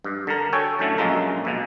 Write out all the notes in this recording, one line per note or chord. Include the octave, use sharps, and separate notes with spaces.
G2
D3 A#4
F#4 A4 C#5 G5 G#5
F#2 A2 D3 A3
A#1 F#2 G#3 F4 A#4 E5
A#1 B2